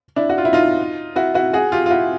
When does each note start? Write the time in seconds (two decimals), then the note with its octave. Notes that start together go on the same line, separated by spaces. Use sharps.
0.16 D4 E4
0.30 F#4
0.38 F4
0.45 E4
0.53 D#4 F4
1.16 E4 F#4
1.34 E4 F#4
1.53 F#4 G#4
1.72 F4 G4
1.86 F4
1.91 E4 F#4